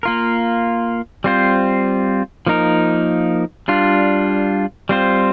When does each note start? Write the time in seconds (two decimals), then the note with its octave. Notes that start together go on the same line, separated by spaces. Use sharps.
0.03 A#3 F4 A#4
1.24 G3 C4 F4 C5
2.47 F3 A#3 D#4 A#4
3.68 G3 D4 F4
4.89 G3 C4 F4 C5